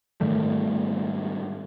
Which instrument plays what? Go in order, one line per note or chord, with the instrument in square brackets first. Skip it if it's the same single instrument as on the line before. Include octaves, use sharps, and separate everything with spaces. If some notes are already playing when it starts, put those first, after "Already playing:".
[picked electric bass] G#2 D#3 G3 A3